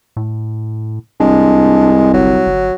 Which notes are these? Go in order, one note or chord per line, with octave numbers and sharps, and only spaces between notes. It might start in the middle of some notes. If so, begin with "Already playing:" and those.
A2
C2 G#3 D4
G1 F#3
G1